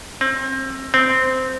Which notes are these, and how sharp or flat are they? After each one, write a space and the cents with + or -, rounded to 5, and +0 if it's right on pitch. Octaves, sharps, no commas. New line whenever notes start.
C4 +30
C4 -10